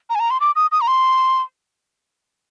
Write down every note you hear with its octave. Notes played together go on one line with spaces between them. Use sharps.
A#5
G#5
A#5
C6
D6
D#6
D#6
A#5
C6